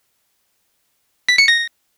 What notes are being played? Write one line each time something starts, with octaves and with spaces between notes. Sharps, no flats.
B6
C#7
A#6